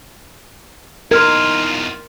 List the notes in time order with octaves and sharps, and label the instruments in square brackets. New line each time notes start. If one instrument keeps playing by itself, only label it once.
[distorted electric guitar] E2 F4 [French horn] D#4 [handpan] A#4 [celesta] C6 F6 G#6